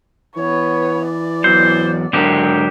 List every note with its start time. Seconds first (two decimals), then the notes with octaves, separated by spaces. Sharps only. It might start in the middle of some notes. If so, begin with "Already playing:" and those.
0.37 E3 B3 C#5
1.07 D5
1.44 E2 F#3 C5
2.13 G#2 D3 F#3 D4 G4 A#4